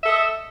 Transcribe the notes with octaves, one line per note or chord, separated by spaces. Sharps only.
A4 D#5 E5